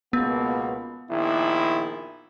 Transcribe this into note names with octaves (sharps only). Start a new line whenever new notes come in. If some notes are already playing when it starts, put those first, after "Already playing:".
C#2 B2 A#3 B3
A#1 D#3 E4